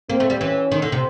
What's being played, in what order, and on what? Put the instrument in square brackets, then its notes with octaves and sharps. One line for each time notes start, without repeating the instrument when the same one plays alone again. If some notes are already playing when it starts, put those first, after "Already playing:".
[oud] A#3 [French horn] C4
[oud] A3
G3
[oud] E3 [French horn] C#4
[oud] D#3
D3
C3